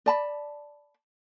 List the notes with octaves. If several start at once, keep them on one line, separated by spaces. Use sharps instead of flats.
D5 A5 B5